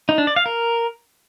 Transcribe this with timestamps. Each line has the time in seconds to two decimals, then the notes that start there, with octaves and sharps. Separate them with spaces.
0.09 D#4
0.18 D4
0.27 D5
0.36 F5
0.46 A#4